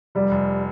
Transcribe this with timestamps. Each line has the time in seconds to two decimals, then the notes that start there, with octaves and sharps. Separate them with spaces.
0.15 F1 G3
0.31 F1